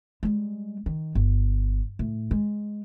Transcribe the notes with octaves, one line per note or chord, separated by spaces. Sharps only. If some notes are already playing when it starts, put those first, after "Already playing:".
G3 G#3
D#3
G1
A2
G#3